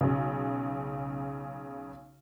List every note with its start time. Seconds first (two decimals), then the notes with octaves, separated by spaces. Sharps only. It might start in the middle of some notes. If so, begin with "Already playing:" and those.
0.01 B1 C#3